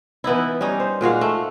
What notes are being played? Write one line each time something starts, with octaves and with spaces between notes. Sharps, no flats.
E3 B3 D#4 E4
G3 C#4 D#4
C5
A#2 G#3 F#4 F5
A3